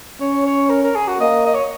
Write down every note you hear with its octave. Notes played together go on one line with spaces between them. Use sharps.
C#4 C#5
C#5
A#4
A#4
G#4
F#4
A#3 D#5
D#5
C#5